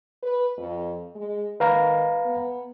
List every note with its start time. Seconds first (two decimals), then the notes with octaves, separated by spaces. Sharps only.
0.23 B4
0.57 F2
1.15 G#3
1.60 D#3 B4 F5 A#5
2.25 B3